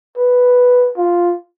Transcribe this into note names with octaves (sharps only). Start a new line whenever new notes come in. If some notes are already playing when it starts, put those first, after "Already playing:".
B4
F4